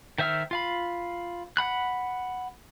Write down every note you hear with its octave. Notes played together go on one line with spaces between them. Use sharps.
D#3 C5 E5 E6 F6
F4 F5 B5
F#5 B5 F#6